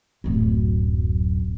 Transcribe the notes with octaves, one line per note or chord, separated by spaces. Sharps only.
D1 F#2